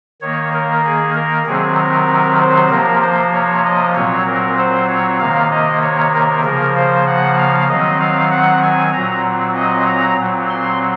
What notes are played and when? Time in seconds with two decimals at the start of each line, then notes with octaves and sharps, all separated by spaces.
0.21 D#3 A#3 C#5
0.53 A#4
0.84 G#4
1.15 A#4
1.46 C3 D#3 F#3 C4 G#4
1.78 A#4
2.40 C5
2.70 C3 F3 A#3 A#4
3.02 C5
3.33 C#5
3.64 D#5
3.95 A#2 F#3 C4 C#5
4.26 A#4
4.58 C5
4.89 C#5
5.19 C3 D#3 A#3 F5
5.51 D#5
5.82 C#5
6.14 A#4
6.44 C#3 F3 A#3 A#4
6.76 C5
7.07 F#5
7.38 F5
7.69 D#3 F#3 C4 D#5
8.00 F5
8.31 F#5
8.63 G#5
8.93 A#2 F#3 C4 A#5
9.56 D#5
9.87 A#5
10.18 A#2 F#3 C4
10.50 C6